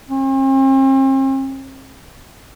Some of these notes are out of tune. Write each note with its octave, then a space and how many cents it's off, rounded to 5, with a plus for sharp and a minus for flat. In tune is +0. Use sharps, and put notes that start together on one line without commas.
C4 +45